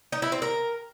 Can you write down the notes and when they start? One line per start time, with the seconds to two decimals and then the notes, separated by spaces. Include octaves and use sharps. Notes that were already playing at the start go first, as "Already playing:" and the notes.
0.12 D#4
0.22 E4
0.32 C4
0.42 A#4